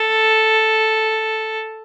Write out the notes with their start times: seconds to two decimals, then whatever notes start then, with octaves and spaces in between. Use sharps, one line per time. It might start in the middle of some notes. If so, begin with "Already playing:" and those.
Already playing: A4